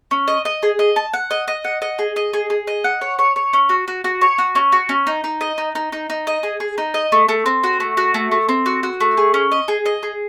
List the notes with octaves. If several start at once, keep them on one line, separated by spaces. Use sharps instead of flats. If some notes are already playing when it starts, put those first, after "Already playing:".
C#4
D#5
D#5
G#4
D#5
A5
F#5
D#5
D#5
F#5
D#5
G#4
D#5
G#4
G#4
D#5
F#5
C#5
C#5
C#5
C#4
F#4
F#4
F#4
C#5
F#4
C#4
F#4
C#4
D#4
D#4
D#5
D#4
D#4
D#4
D#4
D#5
G#4
G#4
D#4
D#5
A3
A3
C4
F#4
A3
F#4
A3
A3
C4
F#4
F#4
A3
G#4
C#4
D#5
G#4
D#5
G#4